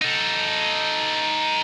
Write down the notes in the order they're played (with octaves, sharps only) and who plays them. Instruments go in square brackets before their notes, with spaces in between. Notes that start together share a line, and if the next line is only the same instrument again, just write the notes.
[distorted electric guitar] D#4 A4